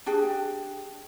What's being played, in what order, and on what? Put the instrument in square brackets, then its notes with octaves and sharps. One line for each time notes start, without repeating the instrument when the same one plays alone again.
[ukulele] D4 G4 G#4 G5